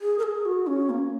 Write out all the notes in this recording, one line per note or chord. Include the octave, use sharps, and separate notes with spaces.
G#4
A#4
G#4
F#4
C#4
A#3